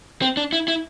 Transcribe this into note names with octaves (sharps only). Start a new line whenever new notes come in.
C4
D4
E4
E4